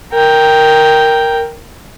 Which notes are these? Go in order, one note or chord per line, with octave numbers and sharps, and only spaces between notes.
A#4 G5